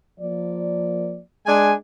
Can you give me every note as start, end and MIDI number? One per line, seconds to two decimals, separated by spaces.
0.20 1.19 53
0.20 1.19 58
0.20 1.19 74
1.47 1.74 56
1.47 1.74 62
1.47 1.74 80